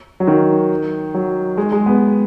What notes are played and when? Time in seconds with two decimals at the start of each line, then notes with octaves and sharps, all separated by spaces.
0.20 F#3
0.27 D#3
1.14 F#3
1.57 G#3
1.72 G#3
1.86 B3